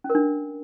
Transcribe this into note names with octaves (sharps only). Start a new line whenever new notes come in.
C#4
A#4
D4